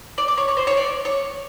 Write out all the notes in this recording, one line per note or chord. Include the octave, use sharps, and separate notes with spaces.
D5
D5
C#5
C#5
C5
C#5
D5
C#5